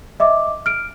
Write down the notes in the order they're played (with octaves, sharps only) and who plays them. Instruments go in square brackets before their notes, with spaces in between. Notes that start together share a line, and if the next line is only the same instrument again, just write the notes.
[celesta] D#5 E5 D6
F6 D7